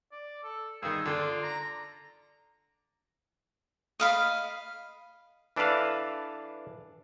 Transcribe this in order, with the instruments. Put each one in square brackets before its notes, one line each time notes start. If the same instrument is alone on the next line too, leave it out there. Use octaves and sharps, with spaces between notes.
[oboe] D5
A4
[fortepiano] G2 D#3 [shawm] G#4 [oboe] E6
[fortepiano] D3 [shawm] F4 [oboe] D5
[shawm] A#5
[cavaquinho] D#5 F5 B5
[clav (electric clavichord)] E3 D4 A4 B4 F5 A5